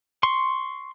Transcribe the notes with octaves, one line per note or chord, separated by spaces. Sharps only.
C6 C#6